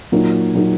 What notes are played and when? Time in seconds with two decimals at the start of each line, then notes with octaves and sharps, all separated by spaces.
0.12 A#2 F#3 A#3 D#4
0.55 A#2 F#3 A#3 D#4